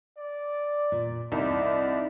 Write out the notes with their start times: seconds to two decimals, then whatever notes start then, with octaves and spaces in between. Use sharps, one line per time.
0.18 D5
0.92 A#2
1.32 C2 D#4 E4 D5